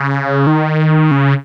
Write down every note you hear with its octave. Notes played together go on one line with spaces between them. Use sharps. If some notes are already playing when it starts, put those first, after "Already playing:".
Already playing: C#3
D#3
C#3